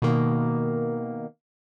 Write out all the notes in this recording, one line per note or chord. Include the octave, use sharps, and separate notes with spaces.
B2 D#3 A#3